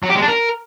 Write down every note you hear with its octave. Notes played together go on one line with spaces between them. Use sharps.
F#3
G4
G#3
D4
A#4